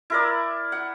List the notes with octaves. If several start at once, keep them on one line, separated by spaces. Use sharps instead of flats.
E4 A#4 D5
F#5